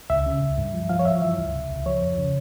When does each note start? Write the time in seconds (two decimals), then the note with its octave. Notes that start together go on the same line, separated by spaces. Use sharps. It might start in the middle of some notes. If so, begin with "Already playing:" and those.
0.10 C#2 E5
0.26 C#3
0.41 C#2
0.58 G2
0.74 F3
0.89 F3 F5
0.99 C#5
1.05 G2 E5
1.22 E3 E5
1.38 C#2
1.54 C3
1.70 C#2
1.86 F3 C#5
2.02 F2
2.18 C#3